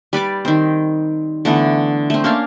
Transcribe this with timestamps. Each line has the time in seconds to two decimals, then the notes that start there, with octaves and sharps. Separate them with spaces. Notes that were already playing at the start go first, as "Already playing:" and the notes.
0.13 G3 B4 D5 D6
0.45 D#3 C4
1.45 D3 E3 A3 B3
2.10 A3 C4
2.24 A#3 C#4 D4 F5